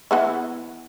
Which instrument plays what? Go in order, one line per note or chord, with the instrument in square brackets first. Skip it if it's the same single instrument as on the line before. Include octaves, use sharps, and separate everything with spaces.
[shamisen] E3 B3 E4